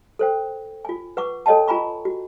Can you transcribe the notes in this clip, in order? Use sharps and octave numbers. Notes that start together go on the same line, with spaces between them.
A4 C5 G5
F4 G#5
B4 F#5 C#6 D6
A4 C#5 D#5 G5 A5
F4 G#5 A#5 B5 C#6
F#4